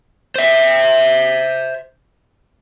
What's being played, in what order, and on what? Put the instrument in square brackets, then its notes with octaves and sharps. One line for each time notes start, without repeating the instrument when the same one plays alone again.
[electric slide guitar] C5 E5